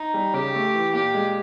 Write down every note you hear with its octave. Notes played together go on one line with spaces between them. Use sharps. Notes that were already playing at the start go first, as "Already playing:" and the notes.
Already playing: D#4
G3
C#3 G4
A3
E3
A#2 G4
G#3